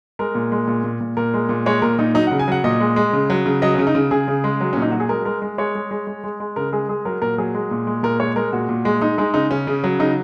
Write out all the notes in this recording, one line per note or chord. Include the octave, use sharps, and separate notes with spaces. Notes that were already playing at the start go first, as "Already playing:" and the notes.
G#3 A#4
A#2
G#3
A#2
A#2
A#2
A#2 A#4
G#3
A#2
G#3 C#5
A#2 A#4
A#2 D#4
F#3 D#4
F#5
C#3
G#5
F#3 F#5
A#2 D#5
G#3
G#3
C#3
F#3
C#3
F#3 D#5
C#4
C#3
D#4
C#3
C#3 G#4
C#3
G#3
F#3
A#2 C#4
D#4
F#3 F#4
G#4
G#3 A#4
G#3 A#4
G#3
G#3 C#5
G#3
G#3
G#3
G#3
G#3
C#3 A#4
G#3 G#4
G#3 G#4
F#3 A#4
A#2 A#4
F#3 G#4
G#3
A#2
G#3
A#2 A#4
G#3 C#5
G#3 A#4
A#2 F#4
A#2
G#3
G#3 D#4
G#3 D#4
C#3 D#4
C#3 C#4
C#3
F#3
C#3 D#4